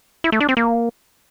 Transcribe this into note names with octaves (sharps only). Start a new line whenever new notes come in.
E4
A3
D4
C4
A#3